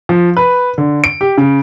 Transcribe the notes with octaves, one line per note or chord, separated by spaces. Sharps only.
F3
B4
D3
D7
G4
C#3